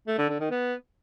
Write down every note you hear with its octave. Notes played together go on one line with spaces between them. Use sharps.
A3
D3
D3
D#3
B3